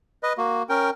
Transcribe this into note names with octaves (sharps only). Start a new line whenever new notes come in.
B4 D#5
A#3 F#4
C#4 A#4 G5